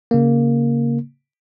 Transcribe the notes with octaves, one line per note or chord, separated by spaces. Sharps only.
C#3 A#3